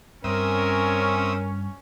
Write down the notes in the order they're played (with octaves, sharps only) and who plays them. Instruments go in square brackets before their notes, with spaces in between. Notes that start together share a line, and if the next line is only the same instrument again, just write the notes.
[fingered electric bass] G2 [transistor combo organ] C4 E5 D#6 [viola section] C#4 [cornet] A#4